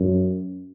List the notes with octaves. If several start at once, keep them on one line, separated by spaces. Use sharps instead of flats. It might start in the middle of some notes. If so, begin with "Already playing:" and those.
Already playing: F#2